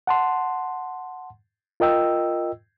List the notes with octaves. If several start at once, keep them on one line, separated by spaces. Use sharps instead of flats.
F#5 A5 C6
F4 A#4 D#5 G5 E6